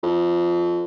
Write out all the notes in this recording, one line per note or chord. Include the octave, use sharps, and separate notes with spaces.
F2